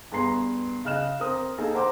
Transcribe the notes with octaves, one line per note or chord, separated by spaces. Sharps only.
G2 B3 G#4 A#5 C6 C7
C#3 D#5 F6 F#6 E7
C4 A#4 D#6
A#3 D#4 G#4 A4
A#4 C5 F#5 A#5 C6 D6